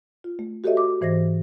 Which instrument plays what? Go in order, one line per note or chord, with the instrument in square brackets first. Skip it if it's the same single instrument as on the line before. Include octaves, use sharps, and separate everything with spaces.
[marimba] F4
A3
F#4 G4 A4 C#5 D#5 E5
D6
G#2 E3 C5 D#5 A#6